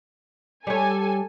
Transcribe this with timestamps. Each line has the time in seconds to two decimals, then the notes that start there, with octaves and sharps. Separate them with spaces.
0.67 G3 A4 C#5 G#5